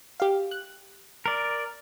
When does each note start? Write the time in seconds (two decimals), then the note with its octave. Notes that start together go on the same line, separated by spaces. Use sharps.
0.20 G4 F5
0.51 F#6
1.26 A#4 D5